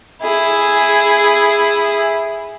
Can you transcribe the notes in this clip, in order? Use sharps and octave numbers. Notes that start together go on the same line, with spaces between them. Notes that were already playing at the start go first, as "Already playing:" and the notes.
E4 G#4